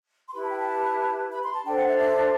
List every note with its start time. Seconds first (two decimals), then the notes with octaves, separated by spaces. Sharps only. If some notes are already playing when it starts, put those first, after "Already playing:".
0.27 C6
0.33 E4 G4 B4 B5
0.41 A5
0.50 G5
0.58 A5
1.32 B5
1.43 C6
1.53 A5
1.65 D4 A4 C5 G5
1.76 F#5
1.87 E5
1.98 E5